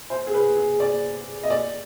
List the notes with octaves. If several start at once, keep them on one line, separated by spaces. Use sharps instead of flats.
C5
G#4
B4
G#4
D5
D#5
D5